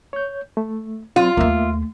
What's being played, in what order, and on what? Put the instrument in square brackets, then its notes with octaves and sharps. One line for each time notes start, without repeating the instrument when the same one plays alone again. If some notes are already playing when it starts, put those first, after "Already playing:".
[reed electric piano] C#5 G6
A3
[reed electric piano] F#3 C4 [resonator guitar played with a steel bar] F4
[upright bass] D#2 A3 [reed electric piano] A#3 E5 F5